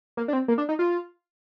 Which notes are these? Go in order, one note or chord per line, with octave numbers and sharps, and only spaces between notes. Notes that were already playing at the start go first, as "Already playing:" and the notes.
A#3
D4
C4
A#3
D4
D#4
F4